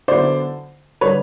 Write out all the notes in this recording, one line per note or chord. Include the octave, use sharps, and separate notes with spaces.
D3 F#3 B3 E4 C5 D5
D3 G3 B4 C#5